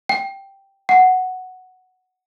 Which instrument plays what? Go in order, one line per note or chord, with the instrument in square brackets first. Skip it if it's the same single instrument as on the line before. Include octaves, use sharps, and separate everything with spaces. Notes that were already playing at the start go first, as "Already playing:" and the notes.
[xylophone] G5
F#5